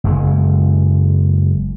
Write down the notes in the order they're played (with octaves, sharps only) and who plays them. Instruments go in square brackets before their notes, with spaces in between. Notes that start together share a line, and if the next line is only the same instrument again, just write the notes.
[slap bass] F#1 G#3